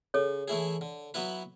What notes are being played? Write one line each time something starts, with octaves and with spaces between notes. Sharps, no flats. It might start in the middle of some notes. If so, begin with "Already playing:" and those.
C#3 A4 C#5
E3 A3 E4 G#4
D3
F#3 B3 E4 B4